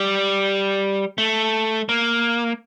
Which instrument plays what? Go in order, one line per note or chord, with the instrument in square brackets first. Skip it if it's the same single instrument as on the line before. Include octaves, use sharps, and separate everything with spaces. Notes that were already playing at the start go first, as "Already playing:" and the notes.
Already playing: [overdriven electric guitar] G3
A3
A#3